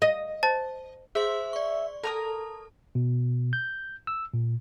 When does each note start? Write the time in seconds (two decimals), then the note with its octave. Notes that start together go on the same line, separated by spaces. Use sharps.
0.02 D#5
0.43 C5 A5 A6
1.15 G#4 C5 E5 C6
1.53 D5 C#6
2.03 A4 A#4 A5 A#5 D#6
2.95 B2
3.53 G6
4.07 E6
4.34 A#2